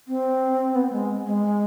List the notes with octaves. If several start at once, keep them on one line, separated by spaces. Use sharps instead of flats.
C4
B3
G#3
G#3